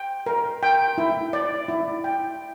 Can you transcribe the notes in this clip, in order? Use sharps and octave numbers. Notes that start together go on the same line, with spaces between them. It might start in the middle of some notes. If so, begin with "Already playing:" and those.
Already playing: G5
A#4
G5
E4
D5
E4
G5